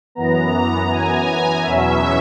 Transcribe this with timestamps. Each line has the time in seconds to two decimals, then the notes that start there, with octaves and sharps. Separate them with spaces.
0.15 F#2 E3 B3 A#5
0.89 G#5
1.63 E2 B2 F#3 C#4 E5